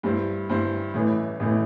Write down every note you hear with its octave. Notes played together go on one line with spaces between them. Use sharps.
G2 G3 E4 C5
G2 G3 E4 C5
A1 A2 E3 A3
A1 A2 E3 A3